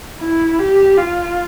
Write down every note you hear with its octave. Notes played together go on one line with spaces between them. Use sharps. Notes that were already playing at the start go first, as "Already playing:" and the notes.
E4
G4
F4